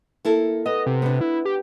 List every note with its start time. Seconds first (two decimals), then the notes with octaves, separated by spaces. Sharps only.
0.25 A#3 E4 A4
0.66 B3 D#5
0.86 C3
1.02 B3 D4
1.21 E4
1.45 G4